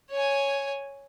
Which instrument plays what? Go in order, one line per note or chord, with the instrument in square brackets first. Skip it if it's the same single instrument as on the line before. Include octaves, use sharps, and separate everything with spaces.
[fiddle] C#5 G#5